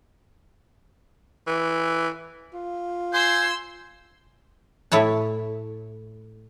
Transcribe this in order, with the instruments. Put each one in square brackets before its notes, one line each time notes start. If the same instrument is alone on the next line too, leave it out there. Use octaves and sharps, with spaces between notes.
[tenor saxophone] E3
F4
[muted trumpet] C5 [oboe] G#5 [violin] C6 E6
[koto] A2 E4 C#5 A5